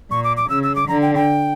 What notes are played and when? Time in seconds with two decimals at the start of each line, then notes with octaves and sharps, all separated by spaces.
0.11 A#2 C#6
0.24 D6
0.37 D6
0.50 C#3 E6
0.63 E6
0.76 D6
0.88 D3 A#5
1.02 G5
1.15 G5